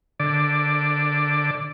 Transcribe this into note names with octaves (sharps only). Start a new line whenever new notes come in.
D3 D5